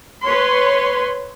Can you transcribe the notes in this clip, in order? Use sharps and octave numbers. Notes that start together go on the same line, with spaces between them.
B4 C#5 C6